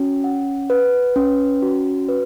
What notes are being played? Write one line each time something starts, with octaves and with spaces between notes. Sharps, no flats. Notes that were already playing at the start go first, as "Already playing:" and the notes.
Already playing: C#4 F#4
F#5
B4
C#4
F#4
B4